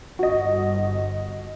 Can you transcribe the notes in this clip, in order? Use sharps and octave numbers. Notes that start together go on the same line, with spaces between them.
G1 F#4 D#5